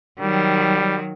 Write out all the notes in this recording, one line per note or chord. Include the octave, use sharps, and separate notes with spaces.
D#3 F#3 G3